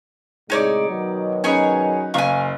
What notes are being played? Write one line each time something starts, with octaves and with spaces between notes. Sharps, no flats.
A2 C3 G#3 D#4 C#5 D5
B2 D#3 F#3
C#4 D#4 G#4 B4 C#5 G#5
F#1 F5 G#5 C#6